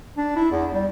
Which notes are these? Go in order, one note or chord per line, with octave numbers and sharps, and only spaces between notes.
D4
E4
E2
G3